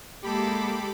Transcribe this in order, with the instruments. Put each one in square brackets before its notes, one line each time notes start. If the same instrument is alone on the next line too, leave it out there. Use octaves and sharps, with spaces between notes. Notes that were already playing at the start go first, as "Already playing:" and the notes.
[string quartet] G#3 A4 [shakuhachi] A#3 [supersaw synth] G4 B5 D6